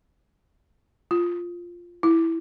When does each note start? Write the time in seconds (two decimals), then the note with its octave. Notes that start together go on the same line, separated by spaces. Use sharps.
1.11 F4
2.03 E4